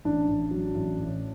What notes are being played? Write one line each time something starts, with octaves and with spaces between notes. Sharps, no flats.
A1 D4
A1
F#3
A1
A2